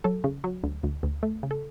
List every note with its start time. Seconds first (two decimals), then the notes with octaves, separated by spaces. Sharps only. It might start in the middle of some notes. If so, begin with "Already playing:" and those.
0.04 F#3 A4
0.24 C#3
0.44 F#3
0.64 D2
0.83 D2
1.03 D2
1.23 A3
1.43 C#3
1.51 A4